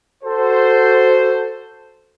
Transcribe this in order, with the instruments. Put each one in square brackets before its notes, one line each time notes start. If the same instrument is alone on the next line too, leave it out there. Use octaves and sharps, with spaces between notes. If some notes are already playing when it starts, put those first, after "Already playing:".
[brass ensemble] F#4 A4 C5